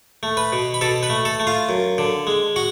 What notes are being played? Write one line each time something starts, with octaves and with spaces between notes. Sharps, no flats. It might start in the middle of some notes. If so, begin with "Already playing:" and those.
A3
B4 B5
B2
B5
B2 A4 A5
B4 B5
A3
A4 A5
A3
F4 F5
F#2
D3
G#3
F#4 F#5